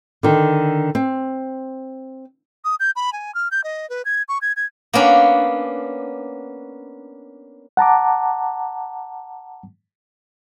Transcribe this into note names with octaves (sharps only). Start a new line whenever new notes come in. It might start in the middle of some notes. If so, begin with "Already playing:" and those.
D3 D#3
C4
D#6
G6
B5
G#5
F6
G6
D#5
B4
G#6
C#6
G#6
G#6
A#3 B3 C#4 D4
F#5 A5 A#5 D6